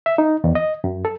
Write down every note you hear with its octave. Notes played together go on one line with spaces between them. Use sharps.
E5
D#4
E2
D#5
F#2
A4